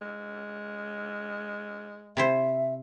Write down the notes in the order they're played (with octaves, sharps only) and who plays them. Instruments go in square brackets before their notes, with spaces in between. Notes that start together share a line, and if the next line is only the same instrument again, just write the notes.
[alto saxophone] G#3
[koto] C3 E4 C5 [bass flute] E5